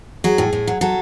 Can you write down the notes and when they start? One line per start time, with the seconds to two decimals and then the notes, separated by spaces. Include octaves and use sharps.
0.24 F#3 G#4
0.38 A2
0.53 A2
0.67 F#3
0.81 F#3 A4